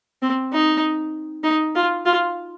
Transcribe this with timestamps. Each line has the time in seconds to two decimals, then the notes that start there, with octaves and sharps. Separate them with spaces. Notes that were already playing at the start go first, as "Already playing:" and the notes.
0.22 C4
0.52 D#4
1.43 D#4
1.75 F4
2.05 F4